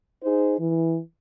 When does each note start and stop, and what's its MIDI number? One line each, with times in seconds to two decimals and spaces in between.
0.23 0.54 63
0.23 0.54 68
0.23 0.54 72
0.58 0.97 52